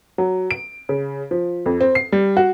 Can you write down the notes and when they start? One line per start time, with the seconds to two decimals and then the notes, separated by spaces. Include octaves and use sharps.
0.18 F#3
0.51 D7
0.89 C#3
1.31 F3
1.66 F2
1.81 C4
1.95 C7
2.12 G3
2.37 F#4